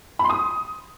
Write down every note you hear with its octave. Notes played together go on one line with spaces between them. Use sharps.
B5
C6
D#6